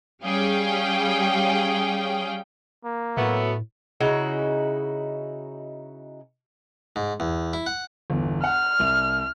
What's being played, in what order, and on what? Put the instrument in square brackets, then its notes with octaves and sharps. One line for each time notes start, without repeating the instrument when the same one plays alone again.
[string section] G3 C#4 G#4 F5 G5
[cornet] A#3
[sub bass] A2 [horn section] F#3 A3 B3
[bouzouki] C#3 D#4 E4 F#4
[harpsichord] G#2
E2
E4
F#5
[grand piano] G1 E2
[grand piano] F#5 [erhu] F6
[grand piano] C2 F7